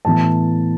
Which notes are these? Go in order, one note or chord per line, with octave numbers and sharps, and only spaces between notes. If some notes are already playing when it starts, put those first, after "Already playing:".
A2 E3 B3 A5